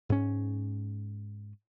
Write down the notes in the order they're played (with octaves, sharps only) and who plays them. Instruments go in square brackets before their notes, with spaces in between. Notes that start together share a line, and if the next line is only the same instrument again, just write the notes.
[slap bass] G#2 C#4